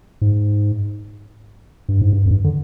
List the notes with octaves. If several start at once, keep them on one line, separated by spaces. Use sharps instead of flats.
G#2
G2
G#2
G2
F2
G2
D3